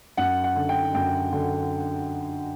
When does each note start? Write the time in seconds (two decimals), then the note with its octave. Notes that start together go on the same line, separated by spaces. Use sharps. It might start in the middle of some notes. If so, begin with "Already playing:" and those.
0.17 F#2 F#5
0.44 F#5
0.56 D3
0.69 G5
0.94 F#2 G5
1.32 D3